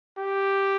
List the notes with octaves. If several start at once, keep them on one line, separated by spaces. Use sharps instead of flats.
G4